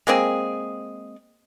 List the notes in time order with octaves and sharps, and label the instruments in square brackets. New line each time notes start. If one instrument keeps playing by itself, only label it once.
[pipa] G#3 A#3 C4 G#4